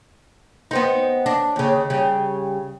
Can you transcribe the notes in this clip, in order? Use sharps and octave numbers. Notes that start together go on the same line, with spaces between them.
B3 C4 D#4
D4
D#2 C#3
C#3 G3